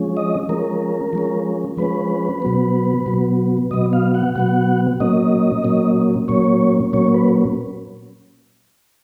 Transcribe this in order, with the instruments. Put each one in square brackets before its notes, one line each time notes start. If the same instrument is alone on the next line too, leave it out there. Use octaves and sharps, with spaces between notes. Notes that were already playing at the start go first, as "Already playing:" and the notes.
Already playing: [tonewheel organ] F3 G#3 C#4
D#5
F3 G#3 C#4 A#4
F3 G#3 C#4
F3 G#3 C#4 B4
B2 F#3 B3
B2 F#3 B3
B2 F#3 B3 D#5
F5
F#5
B2 F#3 B3 F#5
A#2 F#3 A#3 C#4 D#5
A#2 F#3 A#3 C#4
A#2 F#3 A#3 C#4 C#5
A#2 F#3 A#3 C#4 C#5
B4